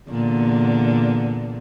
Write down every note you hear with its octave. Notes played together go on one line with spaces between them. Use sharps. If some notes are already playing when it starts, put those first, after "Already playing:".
E2 A#2 D3